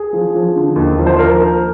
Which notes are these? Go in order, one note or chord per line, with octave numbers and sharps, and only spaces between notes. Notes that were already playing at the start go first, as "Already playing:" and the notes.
Already playing: G#4
F3
F3
D3
D#2
F3
C5
A#4